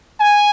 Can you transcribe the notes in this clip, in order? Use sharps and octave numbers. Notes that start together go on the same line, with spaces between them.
G#5